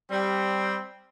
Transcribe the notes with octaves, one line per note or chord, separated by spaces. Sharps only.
G3 C4